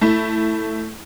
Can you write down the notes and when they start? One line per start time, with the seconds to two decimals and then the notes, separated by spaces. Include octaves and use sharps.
0.01 A3 E4